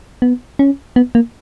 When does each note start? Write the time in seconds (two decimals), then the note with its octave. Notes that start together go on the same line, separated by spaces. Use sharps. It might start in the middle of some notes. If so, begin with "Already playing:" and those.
0.22 B3
0.59 C#4
0.96 B3
1.15 A#3